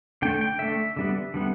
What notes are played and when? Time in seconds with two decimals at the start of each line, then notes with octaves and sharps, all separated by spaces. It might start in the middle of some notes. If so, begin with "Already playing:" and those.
0.22 D3 A3 G5
0.41 G5
0.59 D3 A3 E5
0.97 D3 G3 B3
1.34 D3 G3 B3